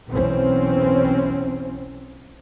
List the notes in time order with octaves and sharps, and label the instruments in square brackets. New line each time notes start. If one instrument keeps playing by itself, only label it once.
[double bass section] B1 E2 C4 C#4